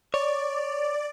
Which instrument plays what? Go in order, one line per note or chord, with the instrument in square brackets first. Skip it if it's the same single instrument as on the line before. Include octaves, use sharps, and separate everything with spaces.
[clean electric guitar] C#5 [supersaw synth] D5